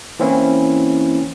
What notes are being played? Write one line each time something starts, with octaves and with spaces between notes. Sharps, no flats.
E3 A#3 C4 C#4 E4